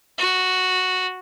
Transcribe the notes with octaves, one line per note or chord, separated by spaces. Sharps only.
F#4